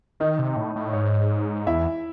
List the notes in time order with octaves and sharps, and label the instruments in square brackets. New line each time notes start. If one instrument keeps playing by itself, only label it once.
[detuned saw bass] D#3 [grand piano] D#4 D#5
[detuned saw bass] C3
A2
A2
[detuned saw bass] G#2 [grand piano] C#5
[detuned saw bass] E2 [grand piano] E4 E5